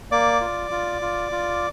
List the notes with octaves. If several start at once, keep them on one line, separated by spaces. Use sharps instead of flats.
A#3 D5 D6
F4
F4
F4
F4